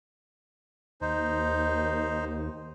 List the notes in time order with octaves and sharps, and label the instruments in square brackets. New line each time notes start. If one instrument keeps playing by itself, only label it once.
[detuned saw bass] D#2 [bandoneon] D#4 C5